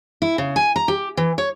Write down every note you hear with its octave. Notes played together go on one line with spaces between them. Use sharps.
E4
C#3
G#5
A#5
G4
E3
C#5